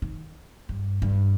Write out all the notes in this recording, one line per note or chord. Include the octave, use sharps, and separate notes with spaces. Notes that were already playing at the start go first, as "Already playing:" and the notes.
D#3
G2
G2